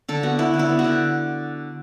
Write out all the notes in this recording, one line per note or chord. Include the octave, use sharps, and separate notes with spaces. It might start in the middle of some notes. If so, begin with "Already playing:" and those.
D3 A4
B3 F#4
B3 E4
D3
E4
B3
F#4
D3